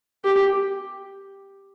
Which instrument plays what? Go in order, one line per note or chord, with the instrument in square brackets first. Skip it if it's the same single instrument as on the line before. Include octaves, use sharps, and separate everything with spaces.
[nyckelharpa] G4